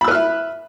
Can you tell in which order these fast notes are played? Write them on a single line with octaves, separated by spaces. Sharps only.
B5 E6 B4 F6 E5